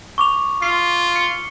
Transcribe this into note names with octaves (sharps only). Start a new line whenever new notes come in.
C#6 D6 F7
F4 C7
C#7 G7